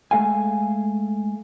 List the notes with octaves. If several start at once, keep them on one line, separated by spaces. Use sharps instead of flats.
G#3 A3 A4 F5 G#5